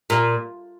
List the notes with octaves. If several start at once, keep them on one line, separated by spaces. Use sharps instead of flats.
A#2